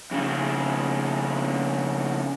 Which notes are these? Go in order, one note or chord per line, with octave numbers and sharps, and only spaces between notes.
F2 C#3